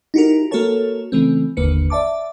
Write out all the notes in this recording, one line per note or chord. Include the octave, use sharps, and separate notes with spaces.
D#4 E4 F#4 G4 A#4
A#3 F#4 A4 A#4 C#5 A5
C#3 E3 A3 C4
G1 D#2 D3 A#3 B4 C#7
D5 E5 A5 D6